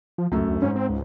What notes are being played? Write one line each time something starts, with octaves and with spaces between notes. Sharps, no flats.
F3
C#2 F#2 A3
D2
G#2 C#4
C4
C#2